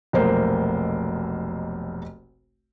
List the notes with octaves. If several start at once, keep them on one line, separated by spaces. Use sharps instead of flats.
F1 B1 A#3 C5